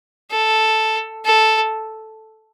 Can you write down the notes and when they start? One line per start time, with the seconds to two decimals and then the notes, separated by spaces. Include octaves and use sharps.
0.31 A4
1.25 A4